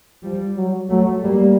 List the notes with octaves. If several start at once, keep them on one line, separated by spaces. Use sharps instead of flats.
F3 G3
F#3
F#3 A3
G3 A#3